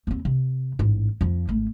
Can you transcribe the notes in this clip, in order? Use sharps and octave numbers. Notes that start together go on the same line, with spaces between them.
D#2 C4
C3
A1 G#2
F2 F3
G#1 A3